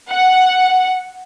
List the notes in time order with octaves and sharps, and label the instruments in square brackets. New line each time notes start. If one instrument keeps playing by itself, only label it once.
[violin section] F#5